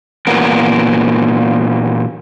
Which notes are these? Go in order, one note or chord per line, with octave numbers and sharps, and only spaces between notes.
A#2 E3 F#3 A#3 B3 A#4